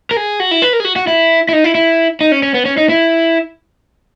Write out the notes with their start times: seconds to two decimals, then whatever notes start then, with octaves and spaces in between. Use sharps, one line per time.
0.11 A#4
0.17 G#4
0.40 F#4
0.51 E4
0.62 B4
0.73 A#4
0.80 G#4
0.85 F#4
0.96 F#4
1.07 E4
1.49 E4
1.53 D#4
1.64 E4
1.75 E4
2.21 D#4
2.32 C#4
2.43 C#4
2.54 B3
2.65 C#4
2.77 D#4
2.89 E4